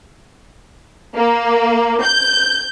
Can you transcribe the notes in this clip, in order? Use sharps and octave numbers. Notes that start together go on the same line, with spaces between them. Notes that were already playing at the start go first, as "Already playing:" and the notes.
A#3
G6